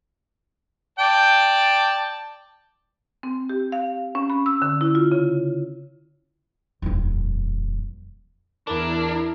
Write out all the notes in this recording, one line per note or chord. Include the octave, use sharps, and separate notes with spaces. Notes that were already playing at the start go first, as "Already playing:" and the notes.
D5 G5 A5
C4
G4
F5
C#4
B5
E6
D3
E4
F4
C#3
D#1 F2
E2 D4 E4 A#4